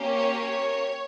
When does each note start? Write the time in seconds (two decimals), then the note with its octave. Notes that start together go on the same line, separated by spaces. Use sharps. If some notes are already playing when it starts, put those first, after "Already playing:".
Already playing: A#3 C#4 G4
0.15 C#5